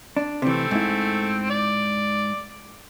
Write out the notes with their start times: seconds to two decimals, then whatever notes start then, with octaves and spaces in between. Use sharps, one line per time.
0.17 D4
0.42 C3 E3 A3 C4
0.71 G#2 E4
1.50 D5